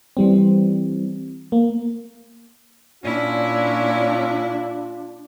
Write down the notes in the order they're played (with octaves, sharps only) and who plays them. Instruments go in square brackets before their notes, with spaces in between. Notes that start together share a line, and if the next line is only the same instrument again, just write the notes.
[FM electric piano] E3 G3 C4
A#3
[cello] A#2 E4 [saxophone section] C#4 [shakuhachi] D4 [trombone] F4